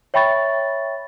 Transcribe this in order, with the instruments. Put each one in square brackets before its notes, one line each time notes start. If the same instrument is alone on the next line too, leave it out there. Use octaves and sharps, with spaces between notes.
[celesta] C#5 E5 G5 B5 C#6 A6